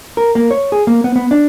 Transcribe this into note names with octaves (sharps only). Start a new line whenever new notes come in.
A#4
A#3
C#5
G#4
A#3
B3
B3
D4